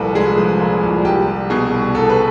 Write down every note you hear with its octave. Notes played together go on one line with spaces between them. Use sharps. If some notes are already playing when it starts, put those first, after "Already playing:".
Already playing: C2 A#2 F3 G#3 A4 B4
G#3 G#4
F3
A#2
C2
C2 G4
G3
B2 G#4
C2
C2 A4
B4